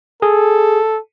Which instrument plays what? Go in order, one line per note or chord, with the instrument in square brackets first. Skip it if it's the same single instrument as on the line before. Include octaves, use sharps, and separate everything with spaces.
[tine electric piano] G#4 [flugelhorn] A4